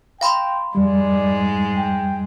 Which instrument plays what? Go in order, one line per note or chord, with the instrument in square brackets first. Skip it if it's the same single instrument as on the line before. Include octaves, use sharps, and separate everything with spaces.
[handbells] F5 B5 C6 [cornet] G5
[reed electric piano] F2 G3 [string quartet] G#2 G#3 [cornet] D5
[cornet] G5